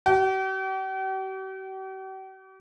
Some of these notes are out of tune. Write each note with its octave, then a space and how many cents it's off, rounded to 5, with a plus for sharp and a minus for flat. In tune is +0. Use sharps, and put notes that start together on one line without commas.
G4 -45